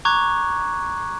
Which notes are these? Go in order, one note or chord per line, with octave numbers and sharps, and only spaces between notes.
A#5 C#6 D6 F#6 G#6